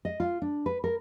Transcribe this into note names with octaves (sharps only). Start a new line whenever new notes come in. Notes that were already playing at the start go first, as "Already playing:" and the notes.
D#5
F4
D4
B4
A#4